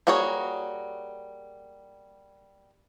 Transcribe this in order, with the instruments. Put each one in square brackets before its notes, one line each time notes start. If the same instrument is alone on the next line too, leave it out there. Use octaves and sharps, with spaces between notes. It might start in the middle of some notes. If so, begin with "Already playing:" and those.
[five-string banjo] G3 A#3 F#4 G#4 C#5